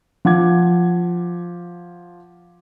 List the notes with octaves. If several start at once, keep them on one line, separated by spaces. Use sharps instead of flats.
F3 F#5 D6 G#6